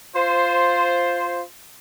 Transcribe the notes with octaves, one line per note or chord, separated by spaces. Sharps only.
F4 C5